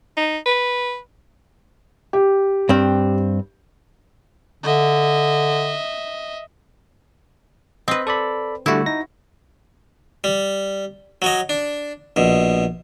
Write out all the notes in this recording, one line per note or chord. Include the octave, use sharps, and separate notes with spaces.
D#4
B4
G4
G2 C4
D3 D#5 E5
C4 B4 D#5
A4 D5 B5
D3 G3 A3 E4 F#4
D#4 A#6
G3
F#3 C#5 D#5
D4
A#1 B2